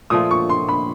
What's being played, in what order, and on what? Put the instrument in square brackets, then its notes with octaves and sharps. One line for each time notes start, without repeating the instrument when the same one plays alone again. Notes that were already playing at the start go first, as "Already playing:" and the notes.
[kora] A#2 F3 A3 [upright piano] D#6
[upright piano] C#6
C6
B5